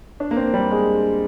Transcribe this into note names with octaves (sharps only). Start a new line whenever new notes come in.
D4
A#3
C4
G3
G#3